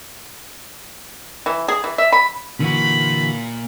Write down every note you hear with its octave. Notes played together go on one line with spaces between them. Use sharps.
E3
G#4
E3
E5
B5
A#2 D3 E3 F#4 B5